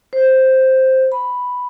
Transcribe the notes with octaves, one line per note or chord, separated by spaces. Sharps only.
C5
B5